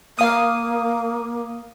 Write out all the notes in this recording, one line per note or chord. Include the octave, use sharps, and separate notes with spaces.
A#3 F5 D#6